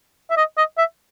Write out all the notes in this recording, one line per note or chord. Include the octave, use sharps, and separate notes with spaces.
E5
D#5
D#5
E5